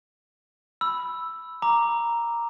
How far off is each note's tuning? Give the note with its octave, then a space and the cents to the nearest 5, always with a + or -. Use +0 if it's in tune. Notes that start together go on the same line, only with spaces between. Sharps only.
B5 +0 E6 +0
A#5 +0 D6 +0